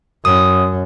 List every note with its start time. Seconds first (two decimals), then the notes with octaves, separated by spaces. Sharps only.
0.25 F#2 D#6